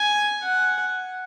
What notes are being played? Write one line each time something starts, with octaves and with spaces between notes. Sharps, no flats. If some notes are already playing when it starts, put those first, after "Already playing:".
Already playing: G#5
F#5